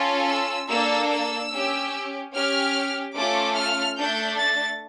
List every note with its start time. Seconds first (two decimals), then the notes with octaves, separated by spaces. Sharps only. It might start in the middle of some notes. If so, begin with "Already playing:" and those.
Already playing: C#4 F4 A4
0.28 E6
0.69 A#3 D4 A4 E6
1.10 E6
1.51 C#4 G4
2.33 C#4 G4 F6
3.15 A3 C#4 F4 A4 D6
3.56 F6
3.97 A3 D4 A4 G6
4.38 A6